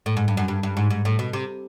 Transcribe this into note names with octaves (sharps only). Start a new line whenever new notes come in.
A2
G#2
G2
F#2
G2
G2
G#2
G#2
A2
B2
C3